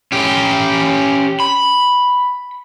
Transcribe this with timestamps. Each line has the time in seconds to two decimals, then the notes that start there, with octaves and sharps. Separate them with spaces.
0.12 C#4 G4
1.40 B5